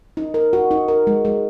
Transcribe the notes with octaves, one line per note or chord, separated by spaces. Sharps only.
D#4
A#4
F#4
D#4
A#4
G#3
G#3